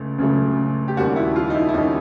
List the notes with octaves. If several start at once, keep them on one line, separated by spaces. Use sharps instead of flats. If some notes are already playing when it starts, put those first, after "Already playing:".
Already playing: C#2 C#3 A3
C#2 C#3 F#3 A3
G4
D#2 D#3 G3 A#3 C#4 F#4
E4
F4
D#4
E4
E4
D#2 D#3 G3 A#3 C#4 D#4